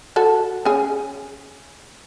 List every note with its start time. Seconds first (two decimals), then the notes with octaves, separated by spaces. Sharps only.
0.16 F#4 A4
0.65 C#4 G#4